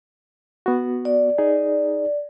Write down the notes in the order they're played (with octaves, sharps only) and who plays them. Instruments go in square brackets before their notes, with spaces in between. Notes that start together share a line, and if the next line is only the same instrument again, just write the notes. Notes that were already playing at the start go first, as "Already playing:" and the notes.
[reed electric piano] B3 F#4
[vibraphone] D5
[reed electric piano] D#4 G#4